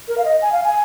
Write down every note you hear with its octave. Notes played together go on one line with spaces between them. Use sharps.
A#4
F5
D#5
G#5
F5
G#5